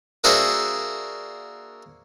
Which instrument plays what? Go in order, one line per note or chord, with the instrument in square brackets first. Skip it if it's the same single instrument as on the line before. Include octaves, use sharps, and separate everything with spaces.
[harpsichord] A#3 D4 F#4 G#4 C5 E5